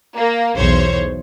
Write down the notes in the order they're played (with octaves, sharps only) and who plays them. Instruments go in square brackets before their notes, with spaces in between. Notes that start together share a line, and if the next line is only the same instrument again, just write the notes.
[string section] A#3
B1 E2 C5 C#5